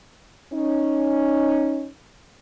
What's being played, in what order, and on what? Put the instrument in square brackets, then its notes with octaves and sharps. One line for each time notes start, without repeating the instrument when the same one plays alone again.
[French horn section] C#4 D#4